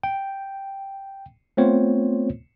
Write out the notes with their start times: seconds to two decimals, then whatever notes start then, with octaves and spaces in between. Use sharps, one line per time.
0.03 G5
1.57 A3 B3 C4 F4 C5 C#5